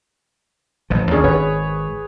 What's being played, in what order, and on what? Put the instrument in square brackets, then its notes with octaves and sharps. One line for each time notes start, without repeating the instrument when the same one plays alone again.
[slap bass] A1 F3
[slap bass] D#2 D3 [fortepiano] C#4 G#4 D5
[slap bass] G#1 [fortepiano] G#4 B4 C#5